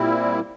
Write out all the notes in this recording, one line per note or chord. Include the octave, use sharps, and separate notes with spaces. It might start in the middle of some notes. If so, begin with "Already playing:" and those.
Already playing: A#2 G3 C4 E4